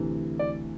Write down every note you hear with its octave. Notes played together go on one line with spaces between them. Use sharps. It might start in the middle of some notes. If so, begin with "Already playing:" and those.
Already playing: D2 C3 E3
D5